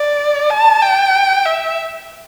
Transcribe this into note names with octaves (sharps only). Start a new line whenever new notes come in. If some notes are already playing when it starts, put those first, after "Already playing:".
Already playing: D5
A5
G5
E5